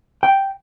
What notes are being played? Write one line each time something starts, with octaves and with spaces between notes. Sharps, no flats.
G5